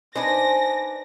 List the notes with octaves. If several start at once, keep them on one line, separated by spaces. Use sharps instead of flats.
D4 D#4 B4 C5 D5 G#5 A#6